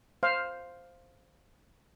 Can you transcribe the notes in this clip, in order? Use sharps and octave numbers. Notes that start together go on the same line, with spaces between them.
C5 F5